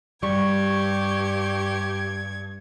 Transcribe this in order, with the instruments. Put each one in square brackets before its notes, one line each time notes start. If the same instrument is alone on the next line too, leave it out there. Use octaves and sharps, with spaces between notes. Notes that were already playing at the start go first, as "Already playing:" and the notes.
[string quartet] G2 G#6 [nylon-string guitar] G3 [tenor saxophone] G4 [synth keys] C#6